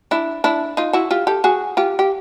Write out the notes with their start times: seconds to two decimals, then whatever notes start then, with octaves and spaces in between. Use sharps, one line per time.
0.11 D4 E4
0.44 D4 E4
0.77 D#4 F4
0.93 E4 F#4
1.11 F4 G4
1.27 G4 A4
1.44 F#4 G#4
1.77 F4 G4
1.99 G4